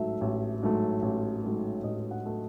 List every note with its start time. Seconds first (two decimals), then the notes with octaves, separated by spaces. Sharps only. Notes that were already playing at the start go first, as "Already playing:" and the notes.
Already playing: A1 G#2 F#3 A3 E5
0.21 A1
0.63 G#2 F#3 A3
1.02 A1
1.44 G#2 F#3 A3
1.84 A1 D#5
2.11 F#5
2.25 F#3 A3